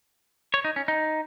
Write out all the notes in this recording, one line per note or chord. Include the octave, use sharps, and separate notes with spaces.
C#5
D#4
C#4
D#4